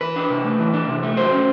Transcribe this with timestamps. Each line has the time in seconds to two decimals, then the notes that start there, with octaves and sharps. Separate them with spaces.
0.01 E3 B4
0.16 D4
0.30 C3
0.44 A3
0.59 E3
0.74 D4
0.88 C3
1.03 A3
1.17 F#3 C5
1.32 C#4